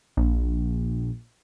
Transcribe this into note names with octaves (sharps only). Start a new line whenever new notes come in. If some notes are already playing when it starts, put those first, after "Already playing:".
A#1